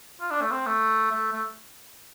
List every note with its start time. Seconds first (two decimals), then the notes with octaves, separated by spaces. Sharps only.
0.21 F4
0.31 D4
0.41 A3
0.51 C4
0.66 A3
1.11 A3
1.32 A3